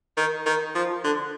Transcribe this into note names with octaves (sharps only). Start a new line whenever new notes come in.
D#3
D#3
F3
D3